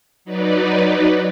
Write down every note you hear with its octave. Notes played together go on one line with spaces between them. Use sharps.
F#3 D#4 B4 D5